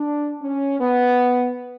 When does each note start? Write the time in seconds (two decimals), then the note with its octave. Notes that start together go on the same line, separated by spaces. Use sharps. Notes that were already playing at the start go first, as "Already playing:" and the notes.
Already playing: D4
0.42 C#4
0.80 B3